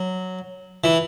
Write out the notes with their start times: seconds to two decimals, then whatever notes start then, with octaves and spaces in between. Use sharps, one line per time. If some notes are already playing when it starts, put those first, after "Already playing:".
Already playing: F#3
0.84 E3